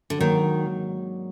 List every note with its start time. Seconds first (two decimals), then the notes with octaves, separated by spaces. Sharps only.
0.10 D3
0.18 G#2 D#3 F#3 A#3 D4